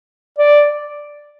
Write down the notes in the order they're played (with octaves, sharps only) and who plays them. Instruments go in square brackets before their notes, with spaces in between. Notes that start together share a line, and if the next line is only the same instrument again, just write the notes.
[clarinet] D5